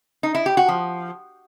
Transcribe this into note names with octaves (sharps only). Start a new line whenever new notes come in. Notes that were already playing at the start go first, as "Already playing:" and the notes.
D#4
E4
G4
F#4
F3